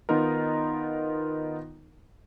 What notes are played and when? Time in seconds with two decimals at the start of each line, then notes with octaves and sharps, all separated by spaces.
0.09 D#3 B3 D#4 F4 A#4